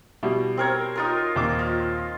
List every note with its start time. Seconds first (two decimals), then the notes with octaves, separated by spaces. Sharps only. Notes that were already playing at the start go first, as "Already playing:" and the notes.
0.23 B2 G3 E4
0.57 C4 A#4 C#5
0.96 D#4 F4 A#4
1.36 D#2 A#2 D6
1.59 F4